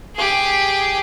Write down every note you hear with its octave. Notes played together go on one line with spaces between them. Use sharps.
G4 G#4